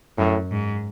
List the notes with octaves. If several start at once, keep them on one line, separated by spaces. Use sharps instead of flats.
F#2 A2
G#2